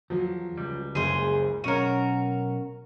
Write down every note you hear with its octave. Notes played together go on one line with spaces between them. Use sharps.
E2 F3 F#3
C#2 G3
F#1 G#4 C5
B1 C#4 F#4 A#4 C#5 D#7